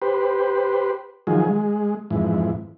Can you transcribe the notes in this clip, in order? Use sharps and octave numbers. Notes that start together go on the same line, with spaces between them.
G4 B4 C5
D#3 F3 F#3 G#4
G#3
F2 G#2 E3